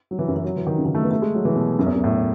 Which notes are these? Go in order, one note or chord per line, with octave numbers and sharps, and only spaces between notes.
F#3
E3
F#2
E3
F#3
E3
D#3
C#3
D#3
A3
B3
A3
G#3
F#3
E3
B2
F#2
E2
F#2
A2